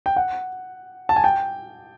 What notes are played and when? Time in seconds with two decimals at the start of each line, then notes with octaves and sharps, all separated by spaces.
0.06 G5
0.16 F#5
1.09 A5
1.16 G#5
1.24 G5